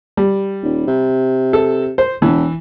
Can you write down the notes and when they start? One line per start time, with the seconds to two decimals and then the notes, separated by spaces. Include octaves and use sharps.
0.17 G3
0.63 D#1
0.87 C3
1.53 A4
1.98 C5
2.22 E1 E3